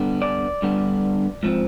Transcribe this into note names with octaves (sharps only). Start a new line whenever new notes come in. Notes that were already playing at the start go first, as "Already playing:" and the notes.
Already playing: G2 D3 G3 B3
D5
G2 D3 G3 B3
G#2 F3 C4